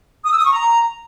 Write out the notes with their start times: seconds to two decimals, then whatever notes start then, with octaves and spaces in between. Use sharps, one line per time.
0.24 D#6
0.31 E6
0.38 D#6
0.45 C#6
0.52 A#5